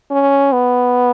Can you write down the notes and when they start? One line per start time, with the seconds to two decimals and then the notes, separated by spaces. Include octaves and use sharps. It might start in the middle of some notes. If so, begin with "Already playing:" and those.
0.11 C#4
0.53 B3